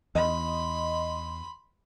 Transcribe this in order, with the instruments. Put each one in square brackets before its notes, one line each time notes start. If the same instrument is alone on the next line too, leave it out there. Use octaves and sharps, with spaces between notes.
[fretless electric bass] E2 [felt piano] D#5 [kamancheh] B5 C6